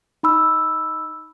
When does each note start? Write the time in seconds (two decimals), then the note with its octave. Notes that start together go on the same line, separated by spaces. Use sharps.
0.23 D#4 B5 E6